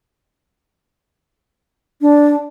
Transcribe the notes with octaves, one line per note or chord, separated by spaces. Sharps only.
D4